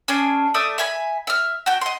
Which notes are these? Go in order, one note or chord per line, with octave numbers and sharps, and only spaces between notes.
C#4 D4 G#4
A3 D5 E5 D#6
E5 G#5 B5
E5 F6
F#4 G5
D#5 C6